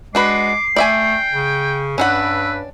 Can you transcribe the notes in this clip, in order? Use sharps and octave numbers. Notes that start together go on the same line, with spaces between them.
G#3 D4 F#4 B4 D6 C7
A3 D5 E5 G5 G#5
C#3
G2 C#4 D4 B4 F#5 E6